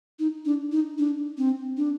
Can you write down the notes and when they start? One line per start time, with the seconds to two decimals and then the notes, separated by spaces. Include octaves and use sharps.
0.19 D#4
0.45 D4
0.72 D#4
0.98 D4
1.38 C4
1.77 D4